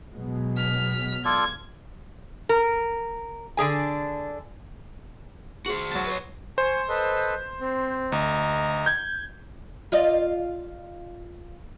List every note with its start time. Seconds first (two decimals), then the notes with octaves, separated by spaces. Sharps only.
0.12 B2 F#3 G#3
0.57 F6 B6
1.25 F4 A4 D5 G#6
2.49 A#4
3.57 D3 D4 G#4 G#5
5.66 F#4 G#4 C5 F#7
5.91 F#3 A5
6.06 B4 C#5
6.58 C5 G#5 C#6
6.89 A4 B4 D#5
7.61 C4
8.12 D2 D#5 A#5
8.86 G6 G#6
9.92 F4 D5 D#5